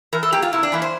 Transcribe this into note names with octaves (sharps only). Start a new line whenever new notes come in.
E3 A#4
A4
A#3 G4
F4
C3 E4
D4
E3 A#3 E4
C5